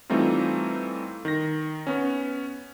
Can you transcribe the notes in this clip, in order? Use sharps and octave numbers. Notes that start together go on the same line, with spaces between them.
E3 G3 A3 C4 D#4 F4
D#3 A#6
B3 C#4